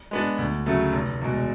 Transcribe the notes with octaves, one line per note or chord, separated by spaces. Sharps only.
G#3 B3 D4
D2
C#3 F#3 A3
F1
E2 B2 G#3